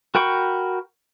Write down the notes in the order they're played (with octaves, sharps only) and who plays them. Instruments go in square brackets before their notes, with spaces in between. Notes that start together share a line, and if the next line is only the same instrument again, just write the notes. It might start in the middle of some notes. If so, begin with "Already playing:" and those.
[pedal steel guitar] F#4 A#4 G5 B5 C#6